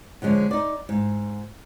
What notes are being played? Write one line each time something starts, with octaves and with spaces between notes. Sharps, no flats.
D3 F3 G#3 C#4
D#4 D5
G#2